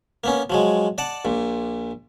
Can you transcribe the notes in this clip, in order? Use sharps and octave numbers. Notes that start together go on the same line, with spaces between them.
A#3 B3 C#4
F3 F#3 G#3
D5 F#5 A5
A#1 A#2